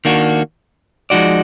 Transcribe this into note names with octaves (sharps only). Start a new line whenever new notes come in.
D#3 A#3 D4 F#4
F3 G#3 D#4 F#4 D5